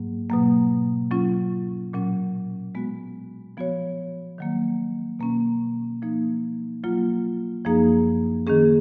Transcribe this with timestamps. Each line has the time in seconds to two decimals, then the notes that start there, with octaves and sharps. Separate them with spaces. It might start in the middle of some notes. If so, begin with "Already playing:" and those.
Already playing: G#2 F#3 A#3
0.30 B2 F#3 A#3
1.11 F#3 C#4 F4
1.93 A#2 F#3 C#4
2.75 G#3 B3 F#4
3.57 F3 B3 F#4 C#5
4.38 D#3 F#3 A#3
5.19 B2 A#3 C#4
6.02 F3 A#3 D#4
6.84 F#3 A#3 F4
7.65 F#2 F3 A#3 D#4 G#4
8.47 D#3 A#3 C#4 G#4